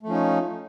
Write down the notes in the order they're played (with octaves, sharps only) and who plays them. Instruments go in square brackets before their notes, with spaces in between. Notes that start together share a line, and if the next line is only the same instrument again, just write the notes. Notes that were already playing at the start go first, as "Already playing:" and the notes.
[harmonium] A3
F3
C#4
D#4